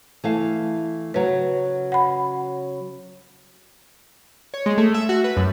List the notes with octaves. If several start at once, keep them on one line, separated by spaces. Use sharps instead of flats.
E3 A3 F5
C#3 F#3 B4
F#5 B5
C#5
G#3
A3
E5
F#4
B4
F#2